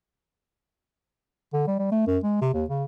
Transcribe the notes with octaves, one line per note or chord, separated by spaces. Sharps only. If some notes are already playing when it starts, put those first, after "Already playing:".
D3
G3
G3
A3
F#2
G#3
C3
D#2
C#3